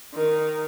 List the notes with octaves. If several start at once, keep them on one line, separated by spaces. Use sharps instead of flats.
D#3